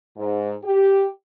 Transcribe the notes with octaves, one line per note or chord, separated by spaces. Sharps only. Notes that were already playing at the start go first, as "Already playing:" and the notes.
G#2
G4